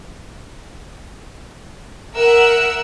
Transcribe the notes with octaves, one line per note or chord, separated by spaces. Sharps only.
A#4 E5 F#5 E6 F#6